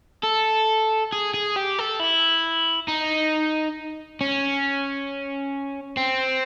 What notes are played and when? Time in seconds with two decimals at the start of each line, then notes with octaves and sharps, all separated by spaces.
0.23 A4
1.13 G#4
1.34 G#4
1.56 G4
1.78 A4
2.00 E4
2.88 D#4
4.21 C#4
5.97 C4